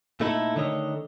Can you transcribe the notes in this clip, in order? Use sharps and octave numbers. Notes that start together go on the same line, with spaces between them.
A#2 A3 D#4 E4 A4
D3 D#3 A3 C#5 D#5